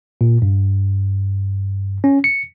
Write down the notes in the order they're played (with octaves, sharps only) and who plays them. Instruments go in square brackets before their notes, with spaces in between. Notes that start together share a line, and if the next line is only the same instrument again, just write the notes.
[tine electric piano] A#2
G2
C#4
C#7